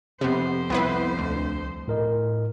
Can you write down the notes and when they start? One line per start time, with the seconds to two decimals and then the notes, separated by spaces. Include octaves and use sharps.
0.21 F2 C3 B3 C5
0.70 C2 B3 E4 B4
1.19 D2
1.88 A2 A#4 D#5